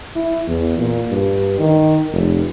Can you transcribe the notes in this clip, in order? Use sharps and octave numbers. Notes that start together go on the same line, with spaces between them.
E4
E2
A#2
G2
D#3
F1